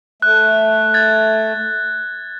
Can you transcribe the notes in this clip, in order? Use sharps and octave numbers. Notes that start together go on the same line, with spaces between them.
A3 F#6
G#6 A6